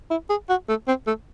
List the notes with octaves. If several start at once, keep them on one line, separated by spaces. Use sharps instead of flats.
E4
G#4
F#4
A3
C4
A3